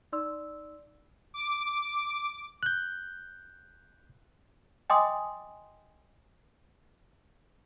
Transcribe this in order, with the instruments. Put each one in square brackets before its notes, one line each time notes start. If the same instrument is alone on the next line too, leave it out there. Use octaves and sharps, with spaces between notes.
[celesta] D#4 D5 C6 E6
[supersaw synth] D6
[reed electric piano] F#6 G6
[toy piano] D#5 G5 G#5 C6 D6 D#6